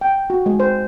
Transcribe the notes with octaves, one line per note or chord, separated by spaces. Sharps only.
G5
F#4
G#3
C5